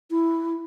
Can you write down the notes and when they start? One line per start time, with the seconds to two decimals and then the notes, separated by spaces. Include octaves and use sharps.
0.11 E4